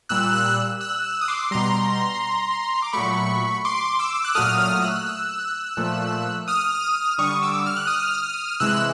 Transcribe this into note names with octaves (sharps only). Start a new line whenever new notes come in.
A#2 G3 E6 F#6
E6 F#6
E6 F#6
E6 F#6
D#6
C6 D6
B2 G3 A#5 C6
D6
A#2 F#3 A3 B5 C#6
C6 D6
D6 E6
F#6
A#2 F#3 A3 D#6 F6
D#6 F6
E6 F#6
E6 F#6
A#2 F3 A3
D#6 F6
D3 G3 C#6 D#6
D6 E6
F6
F#6
D#6 F6
C3 E3 G#3 E6 F#6